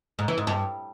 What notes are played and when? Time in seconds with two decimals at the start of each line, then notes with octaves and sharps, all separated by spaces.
0.19 G#2
0.28 E3
0.38 G#2
0.47 G2